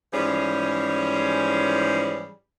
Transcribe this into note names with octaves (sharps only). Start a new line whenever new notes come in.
G#2 E3 F3 G3 C#4 G#4